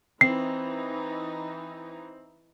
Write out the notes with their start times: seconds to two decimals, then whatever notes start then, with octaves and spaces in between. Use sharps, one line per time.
0.21 E3 C4 D#4 C7